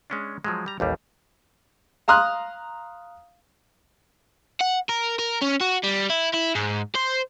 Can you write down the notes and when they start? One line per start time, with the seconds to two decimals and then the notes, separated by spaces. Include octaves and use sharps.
0.10 G#3 C#4 D4
0.44 F3 F#3 G#3
0.66 G3 A#5
0.80 A1 D#2 G3
2.08 F5 A#5 C6 D#6 F6 F#6
4.61 F#5
4.89 A#4
5.19 A#4
5.41 C#4
5.61 F#4
5.83 G3
6.10 E4
6.33 E4
6.55 G#2
6.96 C5